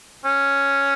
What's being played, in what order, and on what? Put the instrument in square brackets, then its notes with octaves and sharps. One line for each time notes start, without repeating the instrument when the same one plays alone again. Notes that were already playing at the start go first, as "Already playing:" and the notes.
[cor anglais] C#4